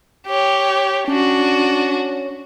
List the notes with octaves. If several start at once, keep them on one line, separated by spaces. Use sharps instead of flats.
G4 C#5
C#4 D4 F#4